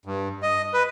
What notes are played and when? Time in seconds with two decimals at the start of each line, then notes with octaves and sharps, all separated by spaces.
0.05 G2
0.43 D#5
0.73 B4